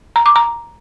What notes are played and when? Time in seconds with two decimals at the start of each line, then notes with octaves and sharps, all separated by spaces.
0.16 A#5
0.26 D6
0.36 A#5